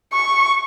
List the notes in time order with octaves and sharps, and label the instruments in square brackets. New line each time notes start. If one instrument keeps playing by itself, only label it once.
[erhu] C#6